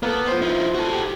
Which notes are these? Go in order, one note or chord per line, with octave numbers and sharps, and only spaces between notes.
A#3 B3 A4
F3 C5
D#4 E4
F#4 A4
G4